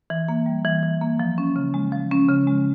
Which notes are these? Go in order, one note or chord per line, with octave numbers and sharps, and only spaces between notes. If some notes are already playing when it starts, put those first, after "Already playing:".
E3
A#3
G3
E3
E3
A#3
F3
C#4
C#3
G#3
F3
C#4
C#3
G#3